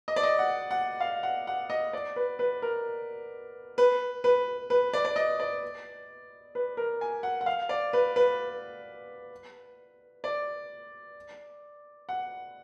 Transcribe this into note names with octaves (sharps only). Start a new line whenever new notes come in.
D#5
D5
D#5
F#5
F#5
F5
F#5
F#5
D#5
D5
B4
B4
A#4
B4
B4
B4
D5
D5
D#5
D5
B4
A#4
G#5
F#5
F#5
F5
D5
B4
B4
D5
F#5